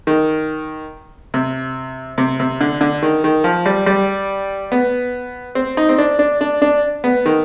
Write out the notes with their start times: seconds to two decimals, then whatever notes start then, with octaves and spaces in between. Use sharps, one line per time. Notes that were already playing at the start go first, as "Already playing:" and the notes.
0.07 D#3
1.34 C3
2.18 C3
2.40 C3
2.61 D3
2.81 D3
3.02 D#3
3.24 D#3
3.44 F3
3.66 G3
3.86 G3
4.72 B3
5.55 C4
5.77 D#4
5.89 C4
5.98 D4
6.19 D4
6.41 D4
6.62 D4
7.04 B3
7.26 D#3